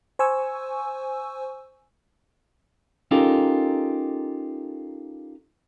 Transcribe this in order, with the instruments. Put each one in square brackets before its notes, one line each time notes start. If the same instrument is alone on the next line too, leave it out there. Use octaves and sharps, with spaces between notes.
[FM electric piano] C5 G#5 C#6 E6
[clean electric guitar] C#4 D#4 F4 G4 A4 A#4